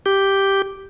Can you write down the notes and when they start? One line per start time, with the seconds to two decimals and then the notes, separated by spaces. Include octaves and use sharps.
0.06 G4